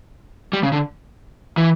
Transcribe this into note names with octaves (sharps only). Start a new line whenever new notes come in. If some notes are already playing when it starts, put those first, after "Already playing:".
G3
C#3
D3
E3